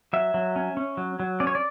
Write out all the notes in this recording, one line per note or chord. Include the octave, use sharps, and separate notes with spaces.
F#3 E5
F#3
C#4
C#4
F#3
F#3
C#4 D5
C#5
D5